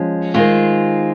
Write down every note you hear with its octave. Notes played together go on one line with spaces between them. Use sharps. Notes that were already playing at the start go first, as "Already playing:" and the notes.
Already playing: F3 G#3 C#4
D#3 G#3 C4 F4